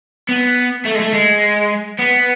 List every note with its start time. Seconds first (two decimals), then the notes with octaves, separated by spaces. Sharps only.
0.29 B3
0.85 A3
0.95 G#3
1.00 A3
1.14 G#3
1.99 B3